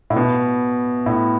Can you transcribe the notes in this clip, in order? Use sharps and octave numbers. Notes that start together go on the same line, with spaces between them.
A2
B2
A2